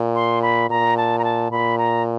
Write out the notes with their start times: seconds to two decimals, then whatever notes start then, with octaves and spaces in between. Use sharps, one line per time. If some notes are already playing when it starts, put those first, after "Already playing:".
Already playing: A#2
0.15 C6
0.42 B5
0.70 A#2 A#5
0.97 A5
1.19 A#5
1.24 A5
1.51 A#2 B5
1.78 A#5